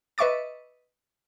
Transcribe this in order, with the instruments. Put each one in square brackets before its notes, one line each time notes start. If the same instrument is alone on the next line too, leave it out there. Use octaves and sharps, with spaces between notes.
[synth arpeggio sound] B4 D#5 E5 C#6 D6 A6